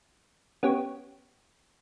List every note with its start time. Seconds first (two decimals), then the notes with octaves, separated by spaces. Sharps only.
0.63 B3 C#4 G4 C#5